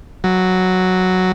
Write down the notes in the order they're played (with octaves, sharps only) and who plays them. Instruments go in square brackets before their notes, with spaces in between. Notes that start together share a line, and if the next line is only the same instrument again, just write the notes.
[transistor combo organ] F#3